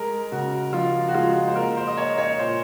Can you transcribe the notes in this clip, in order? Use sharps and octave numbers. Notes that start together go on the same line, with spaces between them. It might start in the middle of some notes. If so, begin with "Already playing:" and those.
Already playing: G#3 A#4
C#3 F#4
F3 F4
F#4
G#3 F4
C5
A#3 A#4
C5
D#5
A#3 C#5
C#5
A#2 C5